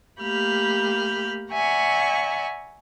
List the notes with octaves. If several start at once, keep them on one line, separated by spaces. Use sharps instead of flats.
A3 A#3 G4 B5 F6 G6
D5 E5 F#5 G#5 A#5 C#6